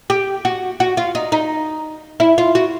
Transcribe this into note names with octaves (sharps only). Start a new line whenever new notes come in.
G4
F#4
F#4
F4
D#4
D#4
E4
F4
F#4